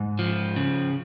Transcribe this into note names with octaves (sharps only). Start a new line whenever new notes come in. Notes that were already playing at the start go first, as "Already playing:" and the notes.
Already playing: G#2
F3
C#3